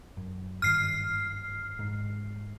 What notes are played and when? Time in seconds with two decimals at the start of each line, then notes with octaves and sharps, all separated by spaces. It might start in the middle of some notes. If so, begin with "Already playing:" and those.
0.17 F#2
0.62 G#1 G2 D#3 F6 C7
1.79 G#2